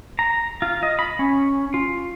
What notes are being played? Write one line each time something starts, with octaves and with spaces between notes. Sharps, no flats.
A#5
F4
D#5
B5
C#4
F4